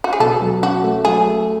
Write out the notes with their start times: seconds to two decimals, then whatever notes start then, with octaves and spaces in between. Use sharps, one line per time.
0.04 F#4
0.13 G#4
0.20 B2 A4
0.41 F#3
0.62 C#4 F#4
0.84 A3
1.05 F#3 G#4
1.26 A3